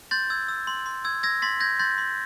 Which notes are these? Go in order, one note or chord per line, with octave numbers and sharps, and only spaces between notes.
C6 G6 A6
E6 G#6
E6
C6
C6
E6 G#6
E6 G#6 A#6
C6 A6 B6
G6 G#6 A#6
C6 G6 A6
C6